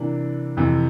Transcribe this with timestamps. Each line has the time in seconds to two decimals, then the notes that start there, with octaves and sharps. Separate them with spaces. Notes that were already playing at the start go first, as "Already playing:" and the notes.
Already playing: C3 E3 A#3 D4
0.57 F2 C3 E3